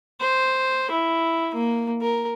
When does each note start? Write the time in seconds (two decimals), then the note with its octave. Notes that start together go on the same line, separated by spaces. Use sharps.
0.20 C5
0.91 E4
1.54 A#3
2.02 A#4